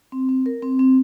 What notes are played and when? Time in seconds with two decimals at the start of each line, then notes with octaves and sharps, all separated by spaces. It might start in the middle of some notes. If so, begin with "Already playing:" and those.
0.12 C4
0.29 C4
0.46 A#4
0.62 C4
0.79 C4